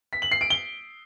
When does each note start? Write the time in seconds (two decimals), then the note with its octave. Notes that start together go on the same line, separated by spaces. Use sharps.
0.13 B6
0.22 F#7
0.32 C7
0.41 D7
0.50 G7